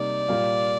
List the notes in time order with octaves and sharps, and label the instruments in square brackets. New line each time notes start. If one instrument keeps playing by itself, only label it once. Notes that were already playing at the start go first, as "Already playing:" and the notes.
Already playing: [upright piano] C3 G3 A#3 D#4 [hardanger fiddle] D5
[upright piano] A#2 G3 A#3 F4